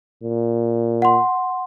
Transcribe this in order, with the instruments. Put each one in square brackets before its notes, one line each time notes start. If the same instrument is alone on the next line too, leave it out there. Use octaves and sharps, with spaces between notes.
[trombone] A#2
[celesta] F#5 C6